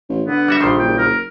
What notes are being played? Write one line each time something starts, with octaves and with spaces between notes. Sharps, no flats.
A1
D3 B3
G3 F#4 E5
A#1 D#3 G3 C6
F#1 G5
A#4